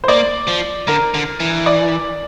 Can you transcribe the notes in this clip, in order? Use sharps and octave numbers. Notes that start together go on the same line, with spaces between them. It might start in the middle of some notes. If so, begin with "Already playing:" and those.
C5
A#3 D5
F3
D3 A#4
D3
E3
D5